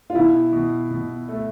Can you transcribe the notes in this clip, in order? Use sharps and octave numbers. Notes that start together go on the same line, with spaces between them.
F4
B2 E4
B2
B2
A3